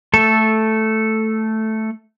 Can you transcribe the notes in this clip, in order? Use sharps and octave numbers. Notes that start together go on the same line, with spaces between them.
A3 A4